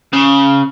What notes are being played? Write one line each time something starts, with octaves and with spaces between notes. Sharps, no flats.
C#3